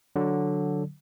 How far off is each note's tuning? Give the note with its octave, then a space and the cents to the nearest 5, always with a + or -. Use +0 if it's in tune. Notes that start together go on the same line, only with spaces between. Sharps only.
D3 +0 F#3 -5